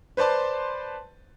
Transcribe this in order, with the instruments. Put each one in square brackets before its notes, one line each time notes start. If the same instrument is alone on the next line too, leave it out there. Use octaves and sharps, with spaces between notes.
[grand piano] B4 C5 D5 A5 C6